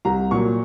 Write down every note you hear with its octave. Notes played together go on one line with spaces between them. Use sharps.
C2 A#5
A#2 F#3 C#6